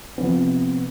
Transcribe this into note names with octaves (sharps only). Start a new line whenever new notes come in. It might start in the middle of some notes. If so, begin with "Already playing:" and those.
C3 F3 B3